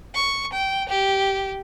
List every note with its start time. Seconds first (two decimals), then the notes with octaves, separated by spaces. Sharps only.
0.15 C#6
0.53 G5
0.89 G4